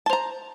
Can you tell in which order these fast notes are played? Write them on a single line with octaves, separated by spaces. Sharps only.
A5 C5 A#5